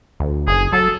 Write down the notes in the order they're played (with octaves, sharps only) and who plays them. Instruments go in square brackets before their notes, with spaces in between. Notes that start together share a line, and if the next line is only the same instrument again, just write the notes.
[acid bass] D2
[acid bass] F#1 [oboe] G#4
[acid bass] F#3 [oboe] A4